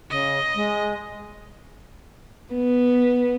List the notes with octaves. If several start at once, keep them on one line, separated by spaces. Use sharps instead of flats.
C#3 D#5
G#3
B3